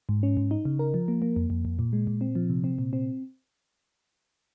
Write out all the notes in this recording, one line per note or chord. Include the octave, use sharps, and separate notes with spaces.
G#2
C#4
G#2
D#4
C#3
A#4
F3
A#3
A#3
F2
F2
F2
A#2
G#3
A#2
C4
F3
C3
C4
A#2
C4